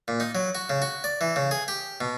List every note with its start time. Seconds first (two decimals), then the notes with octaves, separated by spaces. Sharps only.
0.08 A#2
0.20 D#4
0.35 F#3
0.55 F#4
0.70 C#3
0.82 F#4
1.04 D5
1.21 E3
1.36 C#3
1.51 G#4
1.68 G4
2.01 B2